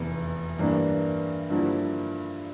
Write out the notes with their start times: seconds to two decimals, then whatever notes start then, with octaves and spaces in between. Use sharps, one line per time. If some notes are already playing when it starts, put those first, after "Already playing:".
Already playing: F1 E2 E3
0.59 G2 E3 A#3 D4
1.50 G2 D3 F3 A#3 E4